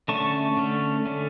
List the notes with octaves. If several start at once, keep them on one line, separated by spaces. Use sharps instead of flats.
D3 A3 C#4 A5 C#6
D3 A3 C#4
D3 A3 C#4